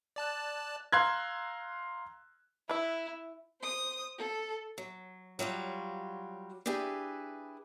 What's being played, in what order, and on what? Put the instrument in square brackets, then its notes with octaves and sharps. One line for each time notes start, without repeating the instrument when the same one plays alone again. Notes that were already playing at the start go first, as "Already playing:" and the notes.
[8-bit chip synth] D5 A5 F#6
[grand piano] F5 A#5 C6 E6 F#6 G#6
[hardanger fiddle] E4 [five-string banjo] B4 E5
[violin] C5 D#6
A4
[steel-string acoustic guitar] F#3
F#3 G3 F4 F#4
D4 E4 G4 G#4 B4